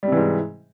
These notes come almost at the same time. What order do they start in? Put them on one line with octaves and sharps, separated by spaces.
G3 C3 E3 G#2